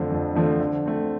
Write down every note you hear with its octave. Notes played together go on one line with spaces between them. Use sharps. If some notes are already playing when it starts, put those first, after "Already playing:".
Already playing: F2 D3 F3 A3 C4
F2
D3 F3 A3 C4
D3
A3 C4